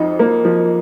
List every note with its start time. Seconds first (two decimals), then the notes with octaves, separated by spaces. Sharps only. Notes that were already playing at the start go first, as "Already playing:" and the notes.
Already playing: F2 F3 D#4
0.19 A#3
0.44 F3